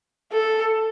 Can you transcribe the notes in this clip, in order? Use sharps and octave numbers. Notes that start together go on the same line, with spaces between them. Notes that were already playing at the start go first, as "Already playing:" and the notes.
A4